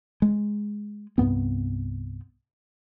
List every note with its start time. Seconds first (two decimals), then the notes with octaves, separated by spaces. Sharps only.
0.22 G#3
1.18 C2 G2 B3 C4